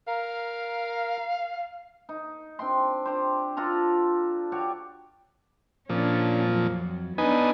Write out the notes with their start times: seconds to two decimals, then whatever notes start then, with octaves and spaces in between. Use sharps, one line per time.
0.07 A#4 F5
2.09 D#4
2.59 C4 D4 G5 C6
3.06 D4 G4 C5
3.57 D4 F4 A4 A#5
4.52 F#4 G4 C#5 D5
5.90 A#2 F3 C#4 D4
6.47 F2 F#3
7.18 B3 D4 D#4 B4 G#5